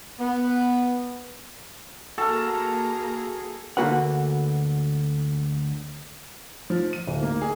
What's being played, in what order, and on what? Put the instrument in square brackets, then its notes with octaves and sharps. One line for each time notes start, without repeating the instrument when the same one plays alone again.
[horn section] B3
[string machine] A#3 A#5 [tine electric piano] F#4 F6 [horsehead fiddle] G#4 [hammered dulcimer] A4
[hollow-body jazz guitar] D2 D3 A#3 F#4 B4 F#5
[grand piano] F3
D#7
D1
A#3
G#4